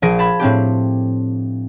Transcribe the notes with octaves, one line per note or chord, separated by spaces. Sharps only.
A#1 F3 G#4 A#6 D7
A5 B5 G#6
A2 C4 D4 G4